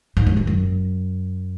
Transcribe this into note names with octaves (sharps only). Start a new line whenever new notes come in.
G#2
F#2
E2
F#2